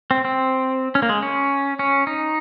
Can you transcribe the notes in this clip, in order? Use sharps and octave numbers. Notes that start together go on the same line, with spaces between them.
C4
C4
C#4
A#3
G#3
C#4
C#4
D#4